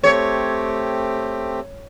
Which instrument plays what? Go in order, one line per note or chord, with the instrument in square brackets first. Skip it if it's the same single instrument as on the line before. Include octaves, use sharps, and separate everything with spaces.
[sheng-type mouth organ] A3 C4 G4 [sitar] C#5